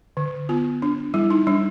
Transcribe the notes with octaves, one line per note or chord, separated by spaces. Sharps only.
D3
B3 F4
D4
G3 E4
D#4
G3 D4